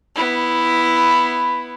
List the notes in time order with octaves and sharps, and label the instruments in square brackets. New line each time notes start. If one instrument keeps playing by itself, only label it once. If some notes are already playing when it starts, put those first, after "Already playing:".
[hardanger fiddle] B3 E4